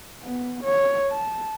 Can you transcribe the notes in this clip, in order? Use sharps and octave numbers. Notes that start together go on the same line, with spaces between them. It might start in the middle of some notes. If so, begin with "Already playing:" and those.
B3
C#5
A5